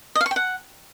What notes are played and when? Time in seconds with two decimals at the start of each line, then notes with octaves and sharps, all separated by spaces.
0.15 D#5
0.21 F5
0.26 C#6
0.31 G5
0.36 F#5